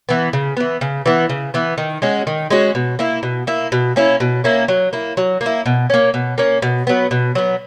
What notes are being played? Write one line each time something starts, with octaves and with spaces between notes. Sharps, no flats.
E3 B3
C#3
E3 B3
C#3
E3 B3
C#3
E3 B3
D#3
G#3 C#4 F#4
D#3
G#3 C#4 F#4
B2
A#3 E4
B2
A#3 E4
B2
A#3 C#4 E4
B2
A#3 C#4 E4
F#3
A#3 E4
F#3
A#3
E4
B2
A#3 C#4
B2
A#3 C#4
B2
F#3 B3
B2
F#3 B3